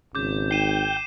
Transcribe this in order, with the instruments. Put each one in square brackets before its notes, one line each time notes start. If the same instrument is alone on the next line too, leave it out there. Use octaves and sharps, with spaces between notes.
[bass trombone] G#1 [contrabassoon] C#3 [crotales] D6 G6
[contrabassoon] G#2 [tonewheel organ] G5 [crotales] C7 D#7 E7